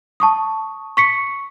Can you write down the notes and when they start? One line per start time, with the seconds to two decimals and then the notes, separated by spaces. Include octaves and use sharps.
0.20 A5 C#6 D#6
0.97 C#6 B6 C#7